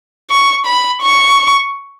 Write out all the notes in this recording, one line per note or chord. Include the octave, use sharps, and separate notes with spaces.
C#6
B5
C#6